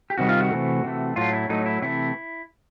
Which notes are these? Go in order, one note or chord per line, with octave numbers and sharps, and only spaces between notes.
G4
C3 D#3 G3 F#4
F4
F#4
C3 E3 A3
C3 E3 A3
A2 F#3 A3 F4
E4
A2 F#3 A3 D#4
E4
C3 E3 A3 E4